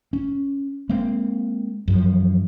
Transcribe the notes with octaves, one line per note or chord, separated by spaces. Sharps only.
C#4
G#3 A#3 C4
F#2 E3 F3